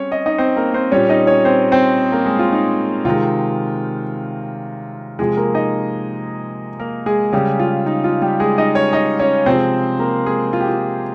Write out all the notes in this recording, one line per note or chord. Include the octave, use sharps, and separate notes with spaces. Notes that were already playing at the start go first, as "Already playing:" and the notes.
Already playing: G3 C4 C#4 C#5
D#5
D#4 D#5
C4 C5
A#3 A#4
C4 C5
A#2 G3 C#4 C#5
D#4 D#5
C#4 C#5
C4 C5
C4 C5
A#3 A#4
G#3 G#4
F4
D#4
C3 D#3 G#3 F4
C3 F3 G#3 G#4
A#3 A#4
D#4 D#5
A#3 A#4
G#3 G#4
C#3 G3 G#3 G4
F4
D#4
F4
G3 G4
G#3 G#4
D#4 D#5
C#4 C#5
D#4 D#5
C#4 C#5
C3 F3 G#3 C4 C5
A#3 A#4
G#3 G#4
F4
G4
F4